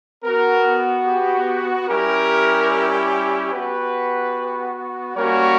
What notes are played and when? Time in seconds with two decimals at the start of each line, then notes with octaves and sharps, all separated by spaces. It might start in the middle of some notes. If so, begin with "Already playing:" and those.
0.23 B3 F#4 A#4
1.06 G4
1.88 G3 C#4 E4 G4 A#4
3.52 B3 F#4 G4 B4
5.16 G3 A#3 C#4 F#4 A#4 C#5